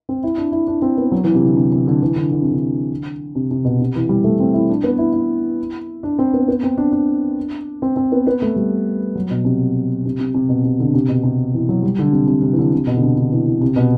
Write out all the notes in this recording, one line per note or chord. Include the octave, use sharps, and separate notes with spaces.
C4
E4
D4
E4
D4
C4
B3
F#3
E3
C3
D3
C3
C3
D3
E3
D3
D3
C3
D3
C3
C3
B2
C3
E3
G3
A3
C4
E4
D4
B3
E4
E4
D4
C4
B3
B3
C4
D4
D4
C4
C4
B3
B3
A3
G3
F#3
B2
C3
C3
C3
C3
B2
C3
D3
C3
B2
C3
E3
F#3
G3
D3
C3
C3
C3
E3
D3
C3
B2
D3
C3
D3
E3
E3
C3
B2